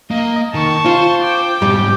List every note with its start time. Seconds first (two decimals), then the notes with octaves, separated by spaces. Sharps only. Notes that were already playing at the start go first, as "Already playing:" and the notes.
0.11 A#3 D#5
0.54 D#3 A5 C#6
0.86 F4 C5
1.23 G5 D6
1.62 G#2 B2 G3